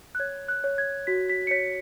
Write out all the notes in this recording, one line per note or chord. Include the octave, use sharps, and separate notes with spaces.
F#6
C#5 G#6
F#6
C#5
G#6
F#4 B6
B6
C#7
C#5 B6